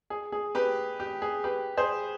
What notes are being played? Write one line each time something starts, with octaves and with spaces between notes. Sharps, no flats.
G#4
G#4
G4 B4
G4
G#4
G4 B4
G#4 C5